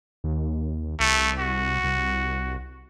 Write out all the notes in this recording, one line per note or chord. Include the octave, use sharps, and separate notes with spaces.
D#2
C2 A3
F#4
C2